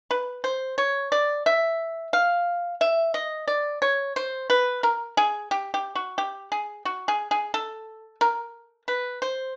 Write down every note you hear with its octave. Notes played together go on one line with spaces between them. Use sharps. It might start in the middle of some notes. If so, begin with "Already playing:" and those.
B4
C5
C#5
D5
E5
F5
E5
D#5
D5
C#5
C5
B4
A#4
G#4
G4
G4
F#4
G4
G#4
F#4
G#4
G#4
A4
A#4
B4
C5